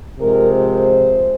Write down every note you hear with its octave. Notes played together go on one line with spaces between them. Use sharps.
C3 F3 G#3 A#4
C5